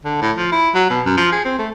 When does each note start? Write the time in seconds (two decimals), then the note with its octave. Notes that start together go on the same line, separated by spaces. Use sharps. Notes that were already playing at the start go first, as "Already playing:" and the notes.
0.05 D3
0.22 A2
0.37 F3
0.52 E4
0.75 F#3
0.90 B2
1.06 F#2
1.17 F3
1.32 G#4
1.45 C4
1.59 A3